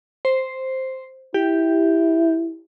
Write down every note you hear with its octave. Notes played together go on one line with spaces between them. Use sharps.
C5
E4 G4